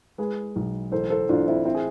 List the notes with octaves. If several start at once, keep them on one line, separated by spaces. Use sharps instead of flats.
G#3 G#4 B4
B1
A1 A4 C5
A4 C5
A1 D4 F4
C4 E4
C4 E4
G#4